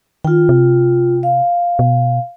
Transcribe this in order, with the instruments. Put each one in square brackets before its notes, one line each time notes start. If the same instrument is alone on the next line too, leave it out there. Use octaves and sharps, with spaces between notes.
[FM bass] D#3 [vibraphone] F4 G5
[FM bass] C3
[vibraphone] F5
[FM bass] B2